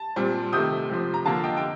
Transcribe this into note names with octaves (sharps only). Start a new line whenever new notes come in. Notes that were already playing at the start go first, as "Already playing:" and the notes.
Already playing: A5
A#2 G3 C4
C3 D#3 A3 D#6 G6
C3 F3 C4
A#5
D3 F3 A#3 F5 A5
D#5 G5
G5